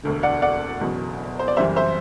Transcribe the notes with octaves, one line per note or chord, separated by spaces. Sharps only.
E1 D2 D3
D5 F#5
D5 F#5
F#1 E2 B2 F#3
C5
D5
F#1 F#2 E3 G3 C5 E5
C5 E5